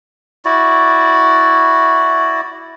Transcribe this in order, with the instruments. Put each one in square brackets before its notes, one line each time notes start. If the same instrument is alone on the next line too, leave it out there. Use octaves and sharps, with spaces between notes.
[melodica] E4 F#4 D5